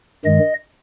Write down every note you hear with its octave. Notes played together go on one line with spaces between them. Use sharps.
G2 D#3 G#3 D#5